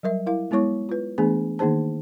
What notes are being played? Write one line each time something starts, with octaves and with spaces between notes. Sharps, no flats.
F#3 G3 A#4 E5
E4 A#4 F5
G#3 B3 E4 C#5 C#6
F4 B4
E3 A3 B3 D4 G#4 G#5
D#3 A#3 D#4 G#4 C5 A5